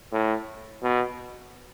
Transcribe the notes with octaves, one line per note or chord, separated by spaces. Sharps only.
A2
B2